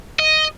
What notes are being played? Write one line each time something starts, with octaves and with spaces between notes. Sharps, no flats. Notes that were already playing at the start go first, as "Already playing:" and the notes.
D#5